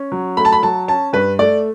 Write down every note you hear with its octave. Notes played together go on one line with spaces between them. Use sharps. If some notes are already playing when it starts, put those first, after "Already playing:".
Already playing: C#4
F#3
A3 B5
A5
B5
F#3 A5
C#4 A5
G2 B4
A3 D5